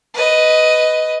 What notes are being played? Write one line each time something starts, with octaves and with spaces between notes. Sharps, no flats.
B4 D#5